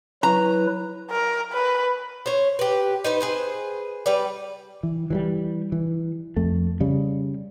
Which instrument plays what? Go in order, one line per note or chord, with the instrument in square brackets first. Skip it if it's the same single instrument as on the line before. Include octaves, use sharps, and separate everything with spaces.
[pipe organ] F#3 E4 B4 [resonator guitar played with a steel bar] A#5
[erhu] A#4
B4
[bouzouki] C5 C#5
G4 B4
D#4 B4 C5
G#4 B4 C5
G3 B4 D5
[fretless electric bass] E3
E3 F#3 G3
E3
F2 A3
C#3 G3